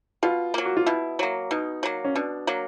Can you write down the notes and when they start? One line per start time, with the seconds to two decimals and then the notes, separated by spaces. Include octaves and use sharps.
0.23 B2 F4
0.54 F#3 A#3
0.65 F#4
0.77 F4
0.86 B2 E4
1.19 F#3 A#3
1.51 B2 D#4
1.83 F#3 A#3
2.05 C#4
2.15 B2 D4
2.47 F#3 A#3